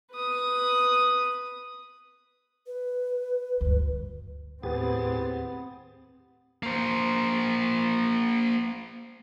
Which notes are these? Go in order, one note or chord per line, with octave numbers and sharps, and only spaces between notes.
B4 D#6
B4
D2 G2
D#2 A2 B3 C4 G4 G#4 B4 A6
A#3 C5